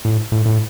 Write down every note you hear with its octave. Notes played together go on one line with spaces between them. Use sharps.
A2
A2
A2